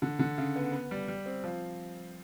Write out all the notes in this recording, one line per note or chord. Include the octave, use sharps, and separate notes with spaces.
D3
D3
C#3
B3
B3
G3
G3
C4
F3